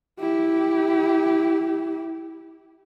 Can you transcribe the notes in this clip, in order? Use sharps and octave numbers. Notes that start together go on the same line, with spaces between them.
E4 G4